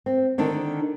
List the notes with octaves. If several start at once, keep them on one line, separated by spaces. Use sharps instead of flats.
C4
D3 D#3 D4 D#4